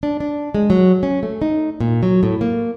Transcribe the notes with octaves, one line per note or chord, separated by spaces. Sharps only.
D4
D4
G#3
F#3
C#4
A3
D#4
A#2
F#3
A2
A#3